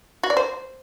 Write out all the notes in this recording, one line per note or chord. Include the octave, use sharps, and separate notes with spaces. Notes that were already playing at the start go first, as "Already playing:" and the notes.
F#4
D5
C5